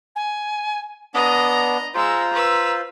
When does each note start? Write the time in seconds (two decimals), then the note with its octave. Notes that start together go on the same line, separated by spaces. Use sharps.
0.15 G#5
1.15 B3 D4 D#5 A#5 D#6
1.94 G#3 F4 C5 A#5 E6
2.33 B4 E6